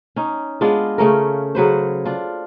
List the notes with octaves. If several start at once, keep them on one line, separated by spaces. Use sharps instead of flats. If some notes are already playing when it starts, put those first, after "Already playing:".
C#4 D#4
G#3 B3 D4 F4
C#3 A3 C#4 A#4
C#3 F#3 B4 C5
D4 F4